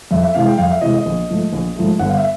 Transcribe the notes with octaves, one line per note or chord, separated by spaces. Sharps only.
F2 E5
E5
C3 E3 G#3 F5
G5
F2 F5
E5
C3 E3 G#3 D#5
D#5
A#1
G#2 F3 A3
A#1
G#2 F3 A3
G1 F#5
F5
E5